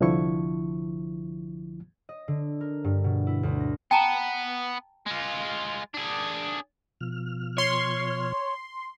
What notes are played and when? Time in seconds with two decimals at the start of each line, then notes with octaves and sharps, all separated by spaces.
0.01 C2 D3 F3 E4 C#6
2.09 D#5
2.28 D3
2.61 A#4
2.84 G2
3.04 B2
3.27 E4
3.43 D2
3.60 A#6
3.91 B3 G5 A5 A#5
5.06 G#3 F4
5.94 D4 G#4
7.01 B2 F3 F6
7.58 C#5 C6